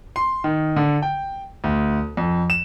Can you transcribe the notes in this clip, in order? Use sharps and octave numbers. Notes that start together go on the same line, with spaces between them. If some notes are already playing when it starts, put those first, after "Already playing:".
C6
D#3
D3
G5
D2
F2
E7